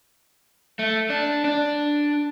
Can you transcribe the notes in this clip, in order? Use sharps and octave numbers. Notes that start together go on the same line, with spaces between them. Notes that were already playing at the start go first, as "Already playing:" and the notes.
A3
D4
D4